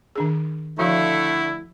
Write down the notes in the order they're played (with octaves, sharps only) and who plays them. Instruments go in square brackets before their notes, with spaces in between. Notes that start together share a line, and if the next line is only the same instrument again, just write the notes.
[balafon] D#3 D4 G#4
[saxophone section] D3 A3 [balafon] F3 F#4 F5 [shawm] E4